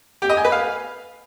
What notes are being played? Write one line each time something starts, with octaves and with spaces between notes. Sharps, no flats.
G4
D#5
G#5
B4
F5